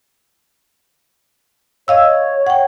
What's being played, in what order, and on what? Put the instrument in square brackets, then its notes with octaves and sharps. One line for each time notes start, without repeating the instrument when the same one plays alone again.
[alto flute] C#5 [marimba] D#5 F5 E6
[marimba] F#5 G5